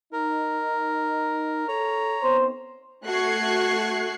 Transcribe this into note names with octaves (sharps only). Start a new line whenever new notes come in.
D#4 A#4
A4 C#5 A#5
B3 C4 D#4 C5
A3 F#4 C#6 F#6 G#6 C7